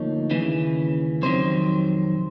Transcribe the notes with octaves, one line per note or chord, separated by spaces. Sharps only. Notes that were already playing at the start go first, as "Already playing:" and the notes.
Already playing: D2 D3 F3 A#3 D#4 C#5
D#2 C#3 E3
F2 C3 D#3 F#3 C5